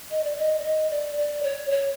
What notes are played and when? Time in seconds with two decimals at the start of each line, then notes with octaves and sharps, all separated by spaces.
0.10 D#5
0.24 D5
0.38 D#5
0.59 D5
0.63 D#5
0.90 D5
1.16 D5
1.43 C#5
1.71 C#5